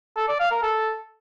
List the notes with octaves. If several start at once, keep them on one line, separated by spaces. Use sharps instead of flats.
A4
D5
F5
A#4
A4